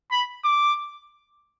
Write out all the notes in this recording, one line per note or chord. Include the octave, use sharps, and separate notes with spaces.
B5
D6